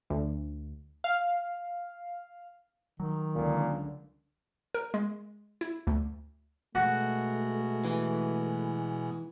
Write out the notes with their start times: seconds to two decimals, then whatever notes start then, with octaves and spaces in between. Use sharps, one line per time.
0.10 D2
1.04 F5
3.00 D#3 F#3
3.35 C#2 A#2 D3
4.74 A#4
4.94 G#3
5.61 E4
5.87 D2
6.75 B2 G#3 A3 F#4
7.85 E3